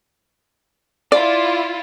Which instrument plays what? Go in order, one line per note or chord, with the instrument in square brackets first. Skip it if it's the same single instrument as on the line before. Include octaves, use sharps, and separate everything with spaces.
[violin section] E4 F4 [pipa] D5